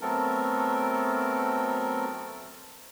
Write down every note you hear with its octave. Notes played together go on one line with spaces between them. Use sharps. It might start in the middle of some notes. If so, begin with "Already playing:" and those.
F#3 A3 B3 C4 A4 A#4